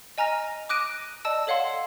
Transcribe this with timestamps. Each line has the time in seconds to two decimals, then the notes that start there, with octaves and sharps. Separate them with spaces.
0.18 D#5 G#5 A#5 F6 A#6
0.69 D6 D#6 F#6 A#6 D7 D#7
1.25 D5 D#5 A5 E6
1.47 A4 C#5 F5 F#5 C6